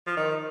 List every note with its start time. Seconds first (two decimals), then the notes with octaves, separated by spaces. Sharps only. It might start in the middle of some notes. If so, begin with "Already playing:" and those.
0.07 F3
0.16 D#3